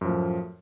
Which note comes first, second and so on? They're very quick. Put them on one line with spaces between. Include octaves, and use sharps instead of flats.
F#2 F3 A2